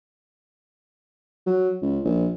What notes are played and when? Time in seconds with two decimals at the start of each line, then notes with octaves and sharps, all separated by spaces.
1.46 F#3
1.82 C#2
2.05 A#1